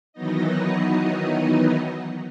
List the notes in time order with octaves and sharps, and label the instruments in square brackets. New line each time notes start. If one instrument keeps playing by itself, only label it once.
[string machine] D#3 E3 F#3 B3 D#4 D#5